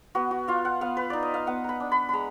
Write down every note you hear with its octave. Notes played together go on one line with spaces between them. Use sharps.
B3 F#4
F#4
F4 F5
F#5
B3 F5
B4
D#4 D5
D#5
F5
B3 F#5
A#5 B5
D4
B5
G#3 A#5 B5